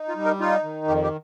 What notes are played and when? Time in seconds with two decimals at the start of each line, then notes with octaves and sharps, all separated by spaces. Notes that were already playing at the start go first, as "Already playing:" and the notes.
Already playing: D#4
0.09 F4
0.16 G3
0.25 A#4
0.40 D#4 F4
0.64 D#3
0.88 F2 G4
1.04 G4